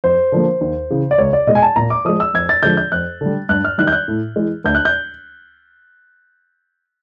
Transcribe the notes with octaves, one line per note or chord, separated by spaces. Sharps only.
F2 C5
D3 F3 A#3
D#2
C#3 E3
D5
C#2 C#5
D5
B2 G#3 D#5
G#5
A5
A#2 A#5
D6
F3 G#3 D#6
E6
F2 G#6
A6
D3 F3 G#3 G6
G6
F2 F#6
D3 G3
G2 F#6
F6
D#3 G3 F#6
G6
F#6
A2
E3 G#3
D2 G6
F#6
G6